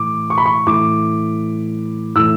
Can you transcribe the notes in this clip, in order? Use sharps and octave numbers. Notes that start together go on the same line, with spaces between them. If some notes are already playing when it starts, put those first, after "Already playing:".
Already playing: A2 E3 D6
C#6
B5
C#6
A2 E3 D6
A2 E3 E6